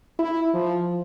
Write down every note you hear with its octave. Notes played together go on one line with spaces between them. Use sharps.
E4
F3